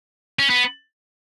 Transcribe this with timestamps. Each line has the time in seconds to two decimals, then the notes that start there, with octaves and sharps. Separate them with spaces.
0.39 C#4
0.50 B3